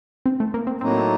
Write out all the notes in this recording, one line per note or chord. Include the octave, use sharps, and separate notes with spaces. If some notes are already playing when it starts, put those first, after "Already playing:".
C4
A3
A#3
C4
A2 F#3 A#3 C4 D#4